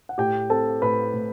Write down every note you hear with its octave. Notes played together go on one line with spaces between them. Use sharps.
F#5
A2 G4 G5
C4 A4 A5
A2 B4 B5
A2